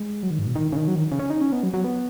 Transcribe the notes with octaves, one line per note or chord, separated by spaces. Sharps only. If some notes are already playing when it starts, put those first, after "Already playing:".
Already playing: G#3
F#3
D#3
G#2
B2
D#3
C#3
D#3
F#3
D#3
C#3
C#4
D#4
C#4
B3
F#3
F#3
B3